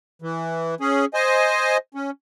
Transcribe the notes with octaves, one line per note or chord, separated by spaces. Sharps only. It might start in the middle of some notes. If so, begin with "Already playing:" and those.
E3
C#4 G#4
C5 D#5 G#5
C#4